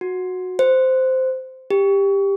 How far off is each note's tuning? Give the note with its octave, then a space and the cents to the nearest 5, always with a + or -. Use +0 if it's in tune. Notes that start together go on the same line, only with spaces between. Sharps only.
F#4 -10
C5 -10
G4 +15